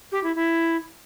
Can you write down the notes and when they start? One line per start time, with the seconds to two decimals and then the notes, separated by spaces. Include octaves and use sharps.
0.12 G4
0.24 E4
0.35 E4